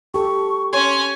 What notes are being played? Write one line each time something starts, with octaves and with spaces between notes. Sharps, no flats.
G4 A4 C#6
C#4 C#5 G#5 C6